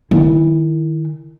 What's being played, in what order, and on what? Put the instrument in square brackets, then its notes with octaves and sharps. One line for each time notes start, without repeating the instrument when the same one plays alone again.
[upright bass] D#3 E4